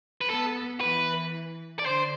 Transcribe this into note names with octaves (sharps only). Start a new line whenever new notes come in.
B4
B3 A4
E3 B4
D5
D3 C5